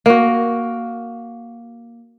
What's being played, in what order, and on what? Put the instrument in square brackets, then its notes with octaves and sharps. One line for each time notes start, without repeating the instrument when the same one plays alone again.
[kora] A#3 F#4